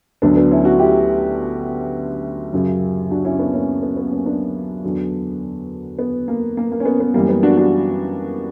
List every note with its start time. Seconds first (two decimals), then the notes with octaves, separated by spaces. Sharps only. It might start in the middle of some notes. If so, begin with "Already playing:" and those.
0.22 D2 D3 F#3 B3 D4
0.36 B3 D4
0.51 C#4 E4
0.65 D4 F#4
0.79 E4 G4
2.53 F#2 C#3 F#3
3.11 D4 F#4
3.25 C#4 E4
3.39 B3 D4
3.53 A#3 C#4
3.83 B3
3.97 B3
4.11 A#3 C#4
4.26 B3 D4
4.84 E2 D3 F#3
5.99 B3
6.28 A#3
6.57 A#3
6.72 A#3
6.80 C#4
6.85 B3
7.00 B3
7.14 F#2 E3 G3 A#3
7.29 B3
7.43 D4 F#4
7.57 D4 F#4